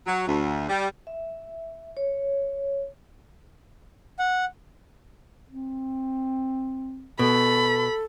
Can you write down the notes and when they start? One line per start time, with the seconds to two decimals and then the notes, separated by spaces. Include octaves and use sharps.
0.07 F#3
0.28 D2
0.69 G3
1.07 E5
1.97 C#5
4.19 F#5
5.49 C4
7.19 B2 A4 B5